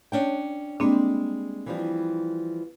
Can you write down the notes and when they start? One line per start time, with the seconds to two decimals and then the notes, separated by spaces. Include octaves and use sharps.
0.12 C#4 D4 G5
0.80 G3 G#3 A#3 C4 D4
1.66 E3 F3 G3